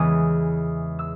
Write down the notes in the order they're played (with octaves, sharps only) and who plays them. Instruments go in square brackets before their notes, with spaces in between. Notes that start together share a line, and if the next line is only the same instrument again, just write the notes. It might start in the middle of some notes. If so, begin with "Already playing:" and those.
Already playing: [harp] E2 C#3 E3 G#3 D#6
E6